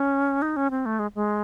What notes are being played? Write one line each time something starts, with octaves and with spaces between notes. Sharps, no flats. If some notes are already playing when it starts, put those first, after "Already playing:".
Already playing: C#4
D#4
C#4
C4
A3
G#3
G#3